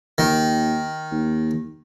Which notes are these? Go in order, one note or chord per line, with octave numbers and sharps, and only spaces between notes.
D#2 D#3
D#2